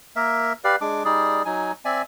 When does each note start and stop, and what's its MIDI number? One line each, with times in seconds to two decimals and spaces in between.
0.16 0.53 58
0.16 0.53 70
0.16 0.53 76
0.64 0.76 67
0.64 0.76 71
0.64 0.76 74
0.64 0.76 77
0.81 1.03 56
0.81 1.03 62
0.81 1.03 86
1.05 1.43 55
1.05 1.43 63
1.05 1.43 68
1.05 1.43 74
1.45 1.72 54
1.45 1.72 63
1.45 1.72 80
1.85 2.02 60
1.85 2.02 74
1.85 2.02 76
1.85 2.02 80